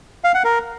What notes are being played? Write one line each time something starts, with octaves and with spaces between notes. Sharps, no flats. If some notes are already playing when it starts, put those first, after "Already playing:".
F5
F#5
A#4